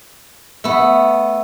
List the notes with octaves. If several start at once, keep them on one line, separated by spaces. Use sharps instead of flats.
A3 B3